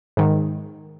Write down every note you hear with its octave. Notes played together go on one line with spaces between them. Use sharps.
G#2 D#3